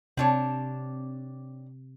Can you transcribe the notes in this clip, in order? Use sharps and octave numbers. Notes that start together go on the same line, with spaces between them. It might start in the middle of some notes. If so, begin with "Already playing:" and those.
C3 C4 D4 C#5